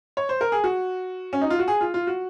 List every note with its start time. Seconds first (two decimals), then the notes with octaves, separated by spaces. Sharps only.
0.17 C#5
0.29 C5
0.41 A#4
0.52 G#4
0.64 F#4
1.33 C#4
1.42 D#4
1.50 F4
1.59 F#4
1.68 G#4
1.81 F4
1.94 F4
2.07 F#4